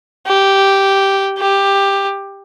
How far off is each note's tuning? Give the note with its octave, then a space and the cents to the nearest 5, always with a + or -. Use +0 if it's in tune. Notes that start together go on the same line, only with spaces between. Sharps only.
G4 -5
G4 +10